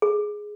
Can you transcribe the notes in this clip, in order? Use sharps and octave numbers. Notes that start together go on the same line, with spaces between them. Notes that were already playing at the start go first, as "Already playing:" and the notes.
G#4